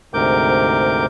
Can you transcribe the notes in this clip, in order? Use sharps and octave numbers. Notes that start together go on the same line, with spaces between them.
D2 G#2 C3 A#4 D6 G6